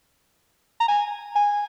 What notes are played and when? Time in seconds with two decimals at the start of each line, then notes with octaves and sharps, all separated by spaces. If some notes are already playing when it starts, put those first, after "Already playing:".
0.80 A#5
0.88 G#5
1.36 G#5